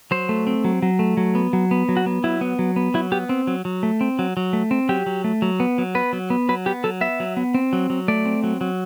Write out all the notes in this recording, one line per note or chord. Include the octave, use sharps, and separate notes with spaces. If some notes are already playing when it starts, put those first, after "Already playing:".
F#3 C5
A3
C4
F#3
F#3
A3
F#3
B3
F#3
B3
F#3
F#4
B3
F#3 E4
B3
F#3
B3
F#3 E4
B3 G4
C4
F#3
F#3
A3
C4
F#3
F#3
A3
C4
F#3 G4
F#3
A3
F#3
B3
F#3
B3 B4
F#3
B3
F#3 B4
B3 G4
F#3 A4
B3 E5
F#3
B3
C4
F#3
F#3
A3 D5
C4
F#3
F#3